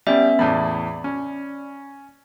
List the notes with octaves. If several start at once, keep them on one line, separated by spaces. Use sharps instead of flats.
G3 B3 C#4 E5
E2 A2 D5 B5
C#4